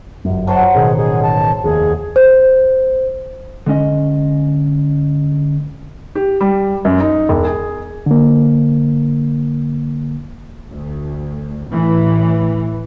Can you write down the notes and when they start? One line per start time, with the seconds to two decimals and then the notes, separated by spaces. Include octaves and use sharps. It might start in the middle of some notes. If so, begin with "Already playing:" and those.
0.25 G1 F#2
0.47 F#3 C5 F#5 A5
0.74 A1 B2 D#3 G#4
0.97 G#4
1.23 A5
1.64 F1 D#2 G#4
2.16 C5
3.66 D3 G#3 C#4 D#5
6.15 G4
6.41 G3
6.85 F#2
7.00 D#4
7.29 E1
7.45 G#4
8.06 D3 A#3
10.70 D2
11.69 A2 E3